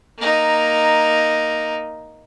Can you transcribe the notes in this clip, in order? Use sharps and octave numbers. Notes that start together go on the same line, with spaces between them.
A#3 D#4